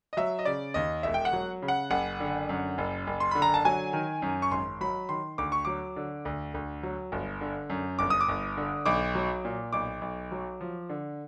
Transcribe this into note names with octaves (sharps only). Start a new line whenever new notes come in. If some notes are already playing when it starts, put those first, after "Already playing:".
D#5
F#3 E5
D#5
C#3 D5
D#2 D#5
E1 E5
G5
F#5
F#3
C#3
F#5
F#1 F#5
D3
F#2
F#1
F#1
C6
D3 B5
A#5
A5
F#3 G#5
D#3
F#2
C#6
G#1 C6
F#3 B5
D#3 C6
D2 D6
C#6
F#3 D6
D3
D2
D2
F#3
G1
D3
F#2
G1 D6
D#6
D6
G1
D3
B1 D6
F#3
A#2
B1 D6
B1
F#3
F3
D3